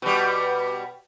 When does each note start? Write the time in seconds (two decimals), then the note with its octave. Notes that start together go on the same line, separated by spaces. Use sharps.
0.02 B2 G3